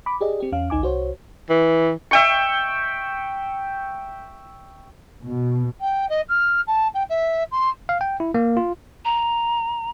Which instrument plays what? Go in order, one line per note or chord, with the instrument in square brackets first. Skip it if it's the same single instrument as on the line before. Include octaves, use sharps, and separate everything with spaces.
[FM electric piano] B5 D6
G4 G#4 D5 D#5
C4 G4
E2 C#4 F5
A1 D2 D#4 G#5 D6
C2 F#4 C5 C#5
[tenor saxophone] E3
[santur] E5 G5 C#6
[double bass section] B2
[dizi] G5
D#5
F6
A5
G5
E5
C6
[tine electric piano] F5
G5
E4
A#3
F4
[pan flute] A#5